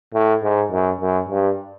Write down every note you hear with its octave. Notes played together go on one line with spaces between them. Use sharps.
A2
G#2
F#2
F#2
G2